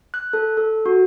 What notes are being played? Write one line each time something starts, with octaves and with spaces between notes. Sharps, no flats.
F#6
A4
A4
F#4